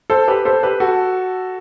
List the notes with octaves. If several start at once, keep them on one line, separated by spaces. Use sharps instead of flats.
A4 C5
G4 B4
A4 C5
G4 B4
F#4 A4